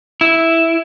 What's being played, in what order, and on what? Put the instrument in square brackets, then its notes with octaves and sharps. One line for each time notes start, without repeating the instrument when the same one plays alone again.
[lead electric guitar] E4